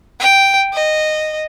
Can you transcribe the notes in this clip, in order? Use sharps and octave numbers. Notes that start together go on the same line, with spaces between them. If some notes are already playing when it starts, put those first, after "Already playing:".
G5
D#5